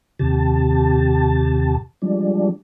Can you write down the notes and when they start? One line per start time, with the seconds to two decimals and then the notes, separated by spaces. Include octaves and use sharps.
0.19 D#2 C3 G4 A5
2.02 F3 G3 G#3 D4